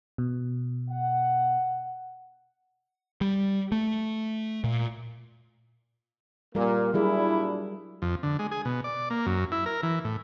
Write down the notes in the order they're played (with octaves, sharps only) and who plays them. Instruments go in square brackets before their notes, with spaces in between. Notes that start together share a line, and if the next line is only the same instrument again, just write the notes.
[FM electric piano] B2
[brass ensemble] F#5
[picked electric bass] G3
A3
A#2
[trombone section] A#2 A#3 [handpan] G3 A#4
[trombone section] A#2 D4 E4 [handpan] F#3 G3 G#4
[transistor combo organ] F2
D3
G#3
G#4
B2
D5
A#3
F#2
E4
A#4
E3
A2